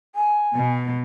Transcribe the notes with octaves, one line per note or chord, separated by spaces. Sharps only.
G#5
B2